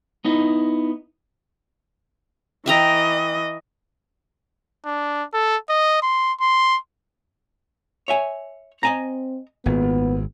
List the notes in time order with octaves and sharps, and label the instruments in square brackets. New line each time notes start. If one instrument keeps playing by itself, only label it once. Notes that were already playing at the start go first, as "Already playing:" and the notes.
[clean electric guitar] B3 D#4 E4 D#5
[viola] E3 D#5 [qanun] E5 G5 A#5
[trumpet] D4
A4
D#5
C6
C6
[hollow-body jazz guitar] C#5 E5 G#5
[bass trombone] C4 [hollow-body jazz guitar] D#5 G#5 A#5
[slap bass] G#1 [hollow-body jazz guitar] A#2 [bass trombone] B3